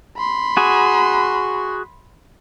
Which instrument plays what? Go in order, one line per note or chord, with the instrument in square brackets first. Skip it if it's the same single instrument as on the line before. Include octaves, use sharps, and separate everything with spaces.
[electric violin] B5 C6
[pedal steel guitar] F#4 G#4